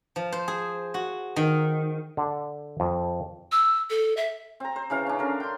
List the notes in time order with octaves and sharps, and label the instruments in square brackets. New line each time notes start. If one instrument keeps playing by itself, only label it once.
[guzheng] F3
C5
G#4
F#4
D#3
[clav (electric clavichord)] D3
F2
[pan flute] E6
A4
E5
[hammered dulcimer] C4 A#5
C5
C#3 E3 F5
C#4 D4
D3 A#4
G5 C6